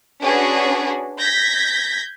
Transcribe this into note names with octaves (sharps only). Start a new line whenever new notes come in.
C#4 D4 F#4 G#4 B4
G6 G#6 A#6 B6